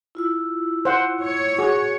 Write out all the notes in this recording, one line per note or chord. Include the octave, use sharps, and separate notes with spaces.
E4 F4 E6
C5 F#5
C#5
F#4 G#4